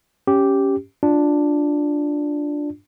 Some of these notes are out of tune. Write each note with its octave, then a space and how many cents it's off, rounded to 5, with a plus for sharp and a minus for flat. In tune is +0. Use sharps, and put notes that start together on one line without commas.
C#4 +0 G4 -5
D4 +0 F4 +10